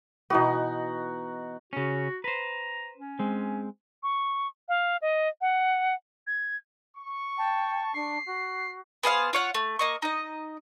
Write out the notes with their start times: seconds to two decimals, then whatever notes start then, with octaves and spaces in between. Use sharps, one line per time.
0.30 B2 E3 B3 D#4 F#4
1.73 C#3 C#4 F#4
2.24 B4 C5 A#5
2.98 C#4
3.19 G#3 C4
4.03 C#6
4.69 F5
5.02 D#5
5.41 F#5
6.27 G#6
6.95 C#6
7.38 G5 A5
7.94 D4 C7
8.26 F#4
9.03 B3 G#4 C5 F5
9.33 F4 C#5 F#5
9.55 A3
9.79 A#3 D#5 C#6
10.02 D#4 D#5